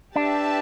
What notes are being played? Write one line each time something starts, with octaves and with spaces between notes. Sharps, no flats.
D4 G4 B4 E5 A5